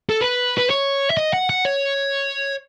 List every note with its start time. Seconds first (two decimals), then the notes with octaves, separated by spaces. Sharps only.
0.09 A4
0.21 B4
0.58 B4
0.70 C#5
1.10 E5
1.17 D#5
1.33 F#5
1.50 F#5
1.65 C#5